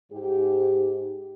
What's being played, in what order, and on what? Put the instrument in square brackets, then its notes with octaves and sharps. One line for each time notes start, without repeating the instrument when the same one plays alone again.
[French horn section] G#2 G4